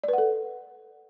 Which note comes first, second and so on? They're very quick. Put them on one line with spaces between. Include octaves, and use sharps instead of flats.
D5 B4 F#5 A4